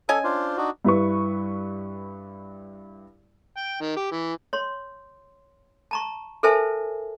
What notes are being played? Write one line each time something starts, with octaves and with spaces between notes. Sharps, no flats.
C#4 A4 D#5 G#5
D4 F4 C5
D4 D#4 F#4
G2 E4 B4 C#6
G5
D#3
G4
E3
C#5 C6
A5 A#5 C#6
A4 A#4 C5 E5 G#5 A5